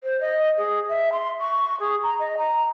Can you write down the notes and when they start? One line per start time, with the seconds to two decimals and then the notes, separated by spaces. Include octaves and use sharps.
0.03 C5
0.20 D#5
0.57 G#4
0.88 E5
1.12 C6
1.39 C#6
1.79 G#4
2.03 A#5
2.19 D#5
2.37 A#5